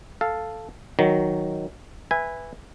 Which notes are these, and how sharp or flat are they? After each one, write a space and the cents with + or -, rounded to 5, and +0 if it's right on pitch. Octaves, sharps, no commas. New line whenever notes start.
A4 +0 F5 +0
D#3 +0 F#3 +0
B4 +0 E5 +0 G#5 -15